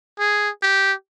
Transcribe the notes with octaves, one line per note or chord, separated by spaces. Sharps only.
G#4
G4